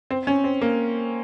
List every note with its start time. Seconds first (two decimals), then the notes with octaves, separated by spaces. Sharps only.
0.11 C4
0.27 C#4
0.44 C4
0.61 A#3